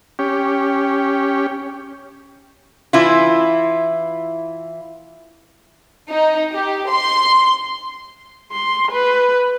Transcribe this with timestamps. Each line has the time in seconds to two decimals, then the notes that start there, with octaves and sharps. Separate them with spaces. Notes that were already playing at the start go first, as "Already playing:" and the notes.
0.19 C#4 G4
2.93 E3 E4 F4
6.09 D#4
6.53 G4
6.89 C6
8.52 C6
8.92 B4